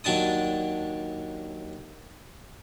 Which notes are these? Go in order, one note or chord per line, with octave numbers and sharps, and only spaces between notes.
D#2 F#3 D4 A5 D#6